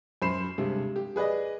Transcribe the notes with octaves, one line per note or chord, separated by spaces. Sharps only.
F#2 C5 B5 C7 E7
G2 C3 G3 G#3
G4
G#4 B4 D5 D#5